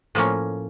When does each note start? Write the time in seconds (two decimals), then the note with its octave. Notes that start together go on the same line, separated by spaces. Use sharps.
0.15 A2 F3 A#3 C#4